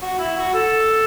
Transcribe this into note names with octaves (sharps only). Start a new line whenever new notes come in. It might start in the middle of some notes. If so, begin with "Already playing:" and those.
F#4
E4
F#4
A4